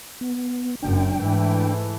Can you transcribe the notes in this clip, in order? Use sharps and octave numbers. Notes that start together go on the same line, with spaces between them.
B3
F#1 F#2 D4 G5
G#2 E3 A3